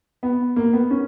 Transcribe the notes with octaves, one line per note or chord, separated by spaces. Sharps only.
B3
A#3
B3
C#4